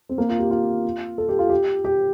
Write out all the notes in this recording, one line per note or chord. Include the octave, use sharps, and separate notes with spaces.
C4
A#3
F4
G4
F4
A4
G4
F4
G4
G4